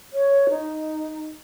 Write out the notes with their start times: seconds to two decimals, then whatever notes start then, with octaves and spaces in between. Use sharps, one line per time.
0.13 C#5
0.50 D#4